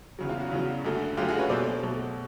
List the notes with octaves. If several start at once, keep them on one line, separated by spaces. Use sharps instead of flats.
E2 C#3 F#3
F4
F#4
E2 C#3 F#3
F#2 D3 F#3 A3
F#2 D3 F#3 A3 F4 G4
F#4 G#4
B4 C#5
B2 F#3 A3 C5 D5
B2 F#3 A3